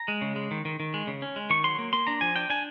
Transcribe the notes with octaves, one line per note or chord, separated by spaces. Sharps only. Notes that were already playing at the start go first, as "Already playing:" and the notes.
Already playing: A#5
G#3
C#3
G#3
D#3
D#3
D#3
G#3
C#3
C#4
G#3
D#3 C#6
F#3 C6
A#3
A#3 C6
D4 A#5
F3 G#5
D4 G5
D4 G#5